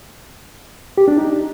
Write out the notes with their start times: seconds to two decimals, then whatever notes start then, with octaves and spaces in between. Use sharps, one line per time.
0.98 G4
1.08 D4
1.18 D#4